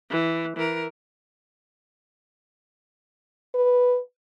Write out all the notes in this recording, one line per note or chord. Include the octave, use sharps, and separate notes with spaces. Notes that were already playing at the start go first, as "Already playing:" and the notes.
E3
E3 A#4
B4